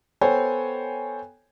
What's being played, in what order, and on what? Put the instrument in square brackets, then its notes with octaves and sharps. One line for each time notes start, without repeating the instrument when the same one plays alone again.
[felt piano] B3 A4 C5 C#5 G5 G#5